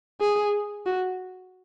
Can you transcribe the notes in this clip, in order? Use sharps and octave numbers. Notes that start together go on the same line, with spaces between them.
G#4
F#4